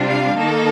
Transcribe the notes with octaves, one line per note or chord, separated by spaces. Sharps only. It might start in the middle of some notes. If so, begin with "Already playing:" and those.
Already playing: C3 G3 D4 F4
F5
D#3 A#3 D#4 A4